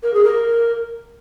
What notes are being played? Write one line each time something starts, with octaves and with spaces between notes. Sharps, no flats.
A#4
G#4
A#4